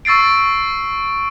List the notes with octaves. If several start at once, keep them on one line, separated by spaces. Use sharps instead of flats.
C#6 E6 A6 C7 D7